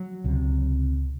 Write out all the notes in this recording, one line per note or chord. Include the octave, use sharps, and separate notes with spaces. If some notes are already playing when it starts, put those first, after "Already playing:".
Already playing: F#3
C#2 C3